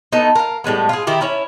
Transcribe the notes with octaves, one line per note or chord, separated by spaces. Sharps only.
A3 B3 D#4
A#4 F5
A2 G3 G#3 B3
F4 G#4
D#3 E4 G4
C#4 E4 C#5